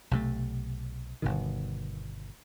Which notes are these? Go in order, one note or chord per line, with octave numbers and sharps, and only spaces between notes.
B1 C3 A3
G1 B2 D#3